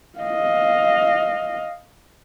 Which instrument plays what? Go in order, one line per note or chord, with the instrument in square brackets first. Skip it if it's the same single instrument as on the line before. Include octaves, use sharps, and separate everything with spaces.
[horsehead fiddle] D#5 F5